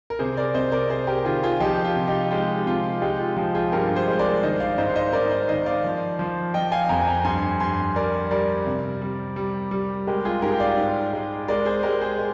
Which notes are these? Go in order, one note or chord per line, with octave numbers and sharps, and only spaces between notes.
A#4
C3 G#4 C5
A#4 D5
C3 C5 D#5
A#4 D5
C3 G#4 C5
G4 A#4
D#3 F4 G#4
F4 G#4
F3 D#4 G4
F4
C3
D#4 G4
G#3 D#4 G4
C3 F4
G#3 D#4 G4
F4
F3 D#4 G4
F4 G#4
G2 G4 A#4
G#4 C5
G#3
A#4 D5
D#3 C5 D#5
D5 F5
G#2 C5 D#5
F5
C5 D#5
G#2 A#4 D5
C5 D#5
D#3 C5 D#5
D5 F5
F3
F3
F3 D#5 G5
F5 G#5
F2 G5 A#5
G#5
G5 A#5
G2 G#5 C6
G2 G#5 C6
G3 A#4 D5
G3 A#4 D5
C3
G3
G3
G3
G#3 G4 A#4
F4 G#4
G#2 G4 A#4
G5
D5 F5
G#2
G#3
G#3 A#4 D5
G#4 C5
G#3 G4 A#4
G#4 C5
G#3